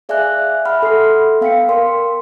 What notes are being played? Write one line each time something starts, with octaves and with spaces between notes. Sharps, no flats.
G#4 D5 E5 F5 G#5 F#6
E5 F#5 B5 F6
A4 C6 C7
B3 F5 G5 B6 C#7
A#4 D5 C6